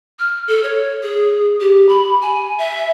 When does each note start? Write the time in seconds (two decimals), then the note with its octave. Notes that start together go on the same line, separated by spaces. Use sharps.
0.19 F6
0.48 A4
0.64 C#5
1.03 G#4
1.60 G4
1.89 B5
2.22 G#5
2.59 E5